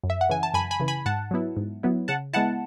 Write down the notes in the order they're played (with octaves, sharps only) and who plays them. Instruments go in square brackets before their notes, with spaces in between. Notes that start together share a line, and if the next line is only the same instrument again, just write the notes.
[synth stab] F#2
E5
F#5
C#3 E3 G#5
A5
F#2 G#5 B5
G#5 B5
C#3 E3
G#5 B5
G#2 F#5 A5
F#3 B3 E4
G#2
F#3 B3 E4
C#3 F#5 A5
G#3 B3 E4 F#5 A5